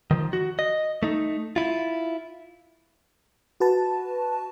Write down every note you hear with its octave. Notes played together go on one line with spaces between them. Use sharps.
D#3 F3
F#4
D#5
A3 D#4
E4 F4
F#4 B4 A5